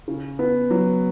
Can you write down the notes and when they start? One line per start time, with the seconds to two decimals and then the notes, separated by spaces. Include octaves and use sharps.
0.08 C#3
0.39 B3
0.70 F#3